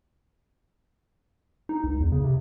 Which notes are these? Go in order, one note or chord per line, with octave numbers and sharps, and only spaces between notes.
D#4
C#2
E2
C#3
C3